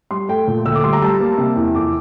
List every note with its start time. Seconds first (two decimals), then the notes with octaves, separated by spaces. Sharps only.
0.11 G3 C6
0.28 A3 G5
0.47 A#2
0.65 D2 E6
0.75 D6
0.84 G3 C6
0.93 A#5
1.02 G3 A5
1.20 A#3
1.38 C3
1.56 E2
1.75 F2 D6